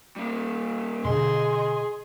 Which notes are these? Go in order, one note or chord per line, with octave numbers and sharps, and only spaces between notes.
G3 A#3
B2 D3 G#4 D#5 C6